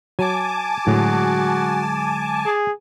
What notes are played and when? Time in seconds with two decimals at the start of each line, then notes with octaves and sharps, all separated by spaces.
0.19 F#3 G#5 A5 D6
0.87 A2 D3 F#3 G#3 F#4
2.46 G#4